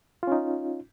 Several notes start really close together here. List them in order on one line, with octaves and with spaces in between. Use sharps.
F4 C#4 D#4